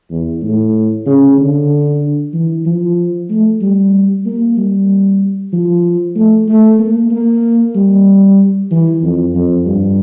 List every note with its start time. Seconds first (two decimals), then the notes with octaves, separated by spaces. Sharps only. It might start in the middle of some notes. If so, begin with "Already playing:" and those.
0.11 E2
0.42 A2
1.06 C#3
1.38 D3
2.33 E3
2.66 F3
3.30 A3
3.61 G3
4.26 A#3
4.57 G3
5.53 F3
6.16 A3
6.48 A3
6.79 A#3
7.11 A#3
7.75 G3
8.71 E3
9.03 F2
9.35 F2
9.66 G2